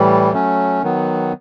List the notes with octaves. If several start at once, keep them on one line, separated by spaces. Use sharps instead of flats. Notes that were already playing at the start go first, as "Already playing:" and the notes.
Already playing: A2 E3 G3
F#3 A3 C#4
D#3 F#3 B3